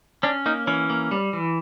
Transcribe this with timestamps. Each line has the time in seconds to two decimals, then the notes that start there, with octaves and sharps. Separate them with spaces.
0.23 C#4 D4
0.46 A#3 D#4
0.67 E3 C#4
0.90 A#3
1.11 G3
1.33 E3